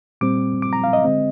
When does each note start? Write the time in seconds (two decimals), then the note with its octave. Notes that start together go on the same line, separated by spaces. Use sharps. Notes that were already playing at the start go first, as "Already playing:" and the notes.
0.21 A#2 G3 C4 D6
0.62 D6
0.73 A#5
0.84 F5
0.93 D#5
1.04 D3 G#3 C4